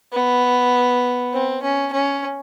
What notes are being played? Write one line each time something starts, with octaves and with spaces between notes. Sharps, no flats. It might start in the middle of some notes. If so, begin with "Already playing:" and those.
B3
C4
C#4
C#4